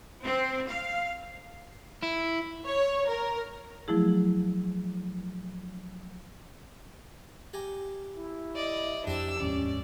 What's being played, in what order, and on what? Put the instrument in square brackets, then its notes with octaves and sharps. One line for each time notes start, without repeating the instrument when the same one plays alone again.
[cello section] C4
F5
[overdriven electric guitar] E4
[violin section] C#5
A#4
[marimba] F3 F#3 A3 E4 G#4
[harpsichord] G4 G#5 A#5
[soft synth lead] E4
[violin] D5 D#5
[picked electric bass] F2 [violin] D4 E6 [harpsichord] G4 C5
[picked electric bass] D#1 F2 G#2 [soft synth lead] C#4 [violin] D5